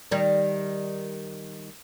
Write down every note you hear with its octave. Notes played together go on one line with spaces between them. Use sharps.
D#3 G3